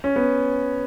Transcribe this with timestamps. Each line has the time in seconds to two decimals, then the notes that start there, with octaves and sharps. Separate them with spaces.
0.04 C#4
0.16 B3